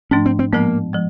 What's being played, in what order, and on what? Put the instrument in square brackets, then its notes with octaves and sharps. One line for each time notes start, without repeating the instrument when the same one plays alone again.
[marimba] G#2 F3 A3 D4 [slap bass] C#4
[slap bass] C4
C4
[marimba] A2 F3 G#3 B3 [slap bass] A#3
[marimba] F3 G#3